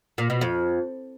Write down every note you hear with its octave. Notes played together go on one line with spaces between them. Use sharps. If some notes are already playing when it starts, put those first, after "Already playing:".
A#2
B2
F2